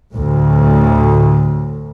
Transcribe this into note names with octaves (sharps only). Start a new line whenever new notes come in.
D2 A2